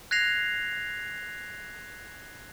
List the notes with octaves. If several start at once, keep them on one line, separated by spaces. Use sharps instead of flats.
F#6 G#6 A#6 C7 F7